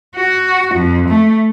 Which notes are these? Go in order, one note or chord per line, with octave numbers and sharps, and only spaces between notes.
F#4
F2
A3